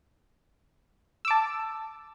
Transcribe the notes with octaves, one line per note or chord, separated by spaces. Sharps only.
A5 D6 E6